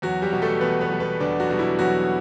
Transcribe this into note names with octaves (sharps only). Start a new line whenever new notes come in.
E2 F#3 F#4
G3 G4
B2 G3
A3 A4
E2 B3 B4
B3 B4
B2 G3
B3 B4
E2 D4 D5
F#3 F#4
B2 G3
E4
E2 F#3 F#4